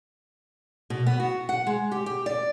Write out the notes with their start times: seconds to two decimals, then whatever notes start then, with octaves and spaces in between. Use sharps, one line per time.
0.90 B2
1.07 B3
1.20 F#4
1.49 F#5
1.67 G#3
1.92 G4
2.06 G4
2.26 D5